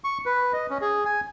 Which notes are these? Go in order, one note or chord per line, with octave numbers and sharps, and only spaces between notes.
C#6
B4
D#5
C#4
G#4
G#5